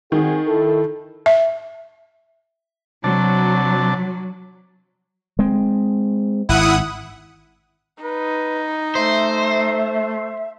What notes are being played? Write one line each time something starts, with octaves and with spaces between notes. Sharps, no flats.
D#3 C4 F#4 G#4
E4 A4
E5
C3 F#3 D4 A5
G#3 C4
G#1 E4 F#5 D#6
D#4 B4
A3 C5 E5